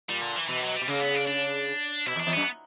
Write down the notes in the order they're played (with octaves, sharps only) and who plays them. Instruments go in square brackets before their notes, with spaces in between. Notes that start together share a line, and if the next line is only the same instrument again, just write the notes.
[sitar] A#2 [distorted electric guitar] G3
[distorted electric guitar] D3
E3
[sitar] B2 [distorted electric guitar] E3
[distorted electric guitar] F#3
G3
[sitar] B2
[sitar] C#3 [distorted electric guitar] A#3
[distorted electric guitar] B3
D4
D4
[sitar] B2 [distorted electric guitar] E4
[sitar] E2
[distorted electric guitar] D4
[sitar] E2
[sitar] F#2 [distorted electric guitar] B3